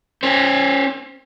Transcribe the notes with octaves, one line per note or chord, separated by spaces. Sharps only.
C#4 C5